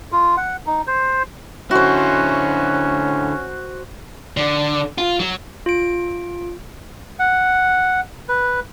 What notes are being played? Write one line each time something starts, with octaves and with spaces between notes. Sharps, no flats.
F4
F#5
D#4
C5
D3 C#4 E4 F#4 C5
D3
F4
F#3
F4 D7
F#5
B4